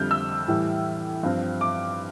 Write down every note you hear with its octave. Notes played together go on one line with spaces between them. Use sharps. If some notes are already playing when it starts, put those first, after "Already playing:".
Already playing: F2 D3 G3 F6 G6
E6
A2 E3 G3
G2 F3 C4
D6